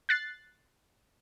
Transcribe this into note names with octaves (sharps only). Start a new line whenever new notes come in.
F#6 A6 C7